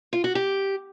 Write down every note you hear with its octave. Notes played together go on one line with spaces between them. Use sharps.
F4
F#4
G4